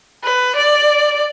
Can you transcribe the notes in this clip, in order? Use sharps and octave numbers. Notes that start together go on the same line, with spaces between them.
B4
D5